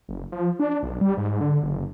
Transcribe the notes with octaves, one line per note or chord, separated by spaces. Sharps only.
F#1
F3
D4
B1
G3
G#2
D3
F#1